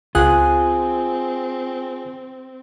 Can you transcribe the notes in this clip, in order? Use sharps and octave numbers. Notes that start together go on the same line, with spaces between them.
C#2 C4 F4 G#4 G#5 D#6 F#6